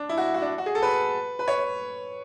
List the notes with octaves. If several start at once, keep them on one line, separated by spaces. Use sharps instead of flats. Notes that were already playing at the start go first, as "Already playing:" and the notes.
Already playing: D4
E4
F#4
F#4
D4
F#4
G#4
A4
B4
B4
C#5